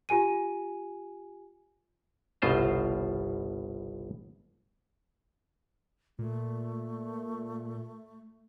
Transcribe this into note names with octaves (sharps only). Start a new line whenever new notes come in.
F4 G4 G#5 D#7
G1 C2 B2 F4 C5 A#5
A#2 A3